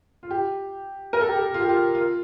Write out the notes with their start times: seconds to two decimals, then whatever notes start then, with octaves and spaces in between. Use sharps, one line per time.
0.23 F4
0.31 G4
1.13 A#4
1.21 A4
1.29 G4
1.37 A4
1.54 F4
1.61 G4
1.69 F4
1.95 F4